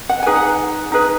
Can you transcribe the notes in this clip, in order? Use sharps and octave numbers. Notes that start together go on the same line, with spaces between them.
F#5
D#4 G#4 B4 G#5
F#5
D#4 G#4 B4